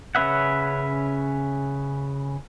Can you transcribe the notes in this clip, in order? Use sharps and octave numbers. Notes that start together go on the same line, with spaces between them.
C#3 C#4 B4 E5 F#5